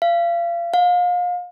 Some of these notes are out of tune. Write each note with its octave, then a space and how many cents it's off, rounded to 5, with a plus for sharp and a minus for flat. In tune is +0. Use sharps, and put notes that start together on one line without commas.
F5 -35
F5 +35